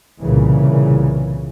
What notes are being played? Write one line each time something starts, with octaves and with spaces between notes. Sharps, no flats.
C2 A#2 C#3 E3